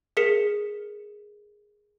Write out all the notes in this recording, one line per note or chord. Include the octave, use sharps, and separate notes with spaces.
G#4 A#4 B6 C#7 E7